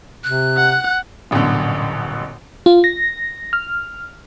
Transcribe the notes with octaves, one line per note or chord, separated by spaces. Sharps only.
C3 F#6
F#5
D#1 A1 F#2 B2 D3
F4
A#6
F6